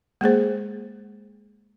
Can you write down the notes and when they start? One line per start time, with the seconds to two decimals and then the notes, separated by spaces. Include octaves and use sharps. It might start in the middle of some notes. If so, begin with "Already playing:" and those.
0.21 G#3 A#3 G#4 C5